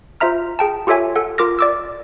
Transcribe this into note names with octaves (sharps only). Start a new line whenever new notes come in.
F4 C5 E5 A#5 F6
G#4 G5 A5
F4 G4 A4 C#5 E5 G#5
A4 F#5
F4 A#4 D6 F6 A#6
D5 D6 E6